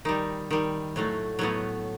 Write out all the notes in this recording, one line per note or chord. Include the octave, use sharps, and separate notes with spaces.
D#3 G3 D#4
D#3 G3
A2 F#3 A3
A2 F#3 A3 B3